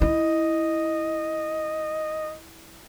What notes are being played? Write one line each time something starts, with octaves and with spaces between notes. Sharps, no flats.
E4 D#5